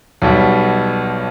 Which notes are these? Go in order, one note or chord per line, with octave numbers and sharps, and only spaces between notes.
B1 B2 G3